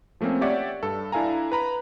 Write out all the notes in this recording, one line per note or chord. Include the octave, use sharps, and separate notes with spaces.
F3 A3 A#3 C4 C#4
G4 C#5 D5 E5 F#5
G2 A4
D4 E4 A4 F5 G#5 A#5
B4 A#5 B5